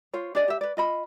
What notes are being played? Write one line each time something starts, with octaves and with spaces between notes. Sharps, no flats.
F4 C5 C#5
D4 G#4 D5 D#5
G4 E5
B4 D5
F4 D#5 B5